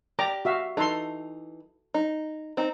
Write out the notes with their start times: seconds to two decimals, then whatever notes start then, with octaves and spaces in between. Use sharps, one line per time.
0.19 G4 D5 A#5 D6
0.45 F#4 E5 F5
0.77 E3 D#4 A4 C6
1.94 D#4
2.57 C4 D#4